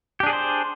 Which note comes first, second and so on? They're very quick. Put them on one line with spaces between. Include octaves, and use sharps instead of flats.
G4 D4 G#4 D5 C5